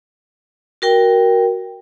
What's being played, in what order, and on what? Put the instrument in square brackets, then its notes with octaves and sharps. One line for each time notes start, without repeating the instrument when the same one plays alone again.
[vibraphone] F#4 A#4 G5